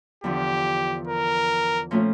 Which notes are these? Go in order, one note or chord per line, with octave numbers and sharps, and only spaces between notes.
E2 D3 F3 G4
A#4
A#2 F3 A3 C#4 F4